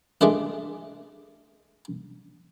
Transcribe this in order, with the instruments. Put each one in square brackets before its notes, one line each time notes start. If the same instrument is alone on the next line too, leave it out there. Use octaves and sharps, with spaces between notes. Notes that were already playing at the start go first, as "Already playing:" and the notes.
[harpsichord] G#3 A3 D4 D#5